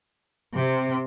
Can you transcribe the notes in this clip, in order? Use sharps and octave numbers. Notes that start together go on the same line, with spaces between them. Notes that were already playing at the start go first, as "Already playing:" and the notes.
C3